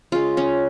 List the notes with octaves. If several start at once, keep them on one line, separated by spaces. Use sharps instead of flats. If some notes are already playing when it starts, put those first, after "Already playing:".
C#3 G#3 F4
C#4